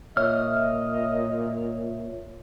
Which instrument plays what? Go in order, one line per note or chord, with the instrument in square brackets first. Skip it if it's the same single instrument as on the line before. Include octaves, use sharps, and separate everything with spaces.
[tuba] A#2 [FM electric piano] C#5 E5 [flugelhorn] D#5 [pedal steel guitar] F6